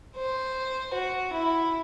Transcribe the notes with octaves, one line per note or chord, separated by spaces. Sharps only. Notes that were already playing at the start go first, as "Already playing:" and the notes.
C5
F#4
E4